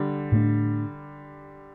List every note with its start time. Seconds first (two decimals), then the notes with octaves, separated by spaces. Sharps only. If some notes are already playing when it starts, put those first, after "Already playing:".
Already playing: D3 G3
0.32 A2 A3 D4